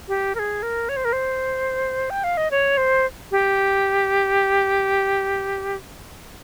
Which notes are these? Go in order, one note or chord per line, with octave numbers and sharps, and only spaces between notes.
G4
A#4
G#4
A#4
C#5
C5
A#4
C5
G5
F5
D#5
C#5
C5
G4